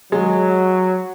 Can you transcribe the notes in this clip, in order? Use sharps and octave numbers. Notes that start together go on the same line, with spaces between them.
F#3 G#3